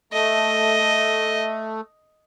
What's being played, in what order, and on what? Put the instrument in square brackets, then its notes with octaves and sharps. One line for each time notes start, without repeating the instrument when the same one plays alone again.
[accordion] A3 [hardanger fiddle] D#5